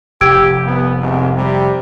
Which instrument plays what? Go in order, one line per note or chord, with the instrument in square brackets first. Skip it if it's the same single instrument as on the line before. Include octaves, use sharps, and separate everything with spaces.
[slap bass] F1 [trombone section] G4 [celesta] E6 G#6 D7
[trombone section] C2 B3
C2 G#2 C3
C3 G3